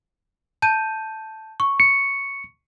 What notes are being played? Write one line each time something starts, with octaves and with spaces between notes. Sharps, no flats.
A5 G6 D#7
C#6
C#7